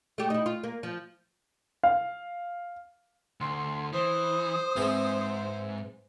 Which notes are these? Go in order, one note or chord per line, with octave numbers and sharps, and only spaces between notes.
A3 G4
D#4 E4
F4
A#3
F3
F5
D2 C6
E3 C5 D#6
G#2 E3 C4 G#4